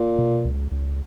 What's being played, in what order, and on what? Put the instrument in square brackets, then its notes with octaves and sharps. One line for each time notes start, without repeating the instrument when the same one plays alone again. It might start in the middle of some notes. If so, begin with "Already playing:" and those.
Already playing: [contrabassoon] A#2
[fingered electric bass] B2
C#2
C#2